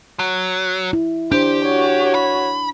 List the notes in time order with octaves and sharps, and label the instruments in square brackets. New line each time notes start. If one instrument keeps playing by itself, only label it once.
[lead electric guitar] F#3
[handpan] E4
[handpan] D4 [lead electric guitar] G4 [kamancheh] C5
[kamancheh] F#4 C#5
[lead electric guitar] B5